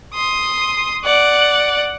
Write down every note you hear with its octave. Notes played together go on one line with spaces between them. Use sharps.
C6 D#6
D5 F#5